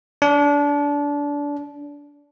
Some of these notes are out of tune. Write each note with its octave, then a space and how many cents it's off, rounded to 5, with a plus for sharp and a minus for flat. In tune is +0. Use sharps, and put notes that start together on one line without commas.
D4 -25